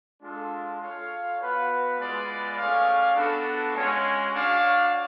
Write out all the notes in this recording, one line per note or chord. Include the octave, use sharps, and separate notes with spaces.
G#3 D4 F4 A4
F4 A4 C#5 F5
B3 F#4 B4 F5
G#3 B3 F4 B4 D5
A3 C#4 G#4 D5 F5
B3 D4 F#4 A4
G#3 C#4 F#4 C#5 F5
D4 F#4 C#5 F5